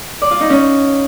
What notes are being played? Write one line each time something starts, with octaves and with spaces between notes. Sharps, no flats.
D5
F4
D#4
C#4